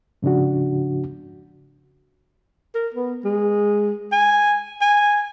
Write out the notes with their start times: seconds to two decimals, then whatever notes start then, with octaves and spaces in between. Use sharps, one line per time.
0.22 G#2 C#3 F3 D4 F#4
2.75 A#4
2.94 B3
3.25 G#3
4.12 G#5
4.81 G#5